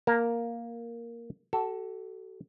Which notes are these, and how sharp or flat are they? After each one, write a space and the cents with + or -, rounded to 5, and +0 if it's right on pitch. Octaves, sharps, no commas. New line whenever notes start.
A#3 +5 A#4 +0 A5 +35
F#4 +40 A4 +0